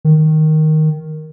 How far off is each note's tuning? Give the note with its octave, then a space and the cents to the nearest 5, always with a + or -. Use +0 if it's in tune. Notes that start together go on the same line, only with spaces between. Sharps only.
D#3 +0